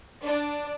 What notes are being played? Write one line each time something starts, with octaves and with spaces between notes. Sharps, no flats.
D4